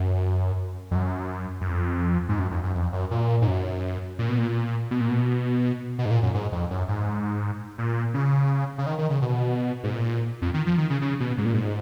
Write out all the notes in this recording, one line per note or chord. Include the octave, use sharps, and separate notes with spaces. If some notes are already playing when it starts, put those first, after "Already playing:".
Already playing: F#2
F2
F#2
F#2
F2
G#2
F#2
F2
F#2
F2
F#2
A#2
G#2
F#2
A#2
B2
A#2
B2
A#2
B2
B2
G#2
A#2
F#2
G#2
F2
F#2
G#2
A#2
C#3
C#3
D#3
D#3
C#3
B2
G#2
A#2
F2
D#3
F3
D#3
C#3
C#3
B2
G#2
A#2
G#2